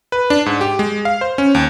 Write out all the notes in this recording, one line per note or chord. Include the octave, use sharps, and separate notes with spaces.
B4
D4
G#2
G4
G#3
F5
C5
C#4
D#2